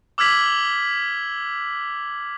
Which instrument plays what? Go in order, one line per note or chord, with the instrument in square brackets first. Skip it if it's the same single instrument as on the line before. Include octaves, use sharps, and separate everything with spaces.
[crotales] D6 E6 F6 G#6 B6 F#7